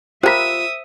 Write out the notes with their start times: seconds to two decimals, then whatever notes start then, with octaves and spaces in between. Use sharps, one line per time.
0.23 F4 G4 A#4 C5 E5 B5 D#6 E6